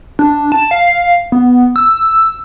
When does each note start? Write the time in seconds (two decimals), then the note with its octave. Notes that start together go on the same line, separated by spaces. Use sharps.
0.19 D4
0.52 A5
0.71 F5
1.32 B3
1.76 E6
1.97 E6